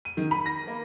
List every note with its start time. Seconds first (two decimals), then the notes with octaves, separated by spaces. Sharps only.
0.05 D#7
0.17 D#3
0.31 B5
0.46 A#6
0.67 A#3